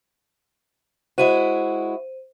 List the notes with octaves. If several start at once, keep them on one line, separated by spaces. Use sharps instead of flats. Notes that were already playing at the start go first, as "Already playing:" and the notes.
G#3 E4 F#4 C5 D#7